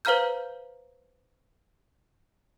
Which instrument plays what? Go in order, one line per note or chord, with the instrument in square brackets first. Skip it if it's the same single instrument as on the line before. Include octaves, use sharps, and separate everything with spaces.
[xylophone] B4 C5 F5 A#5 F6 G6